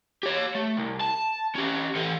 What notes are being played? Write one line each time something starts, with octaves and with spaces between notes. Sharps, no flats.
G4 C#5
A3
C2
A5
C#4 G4
E3 A4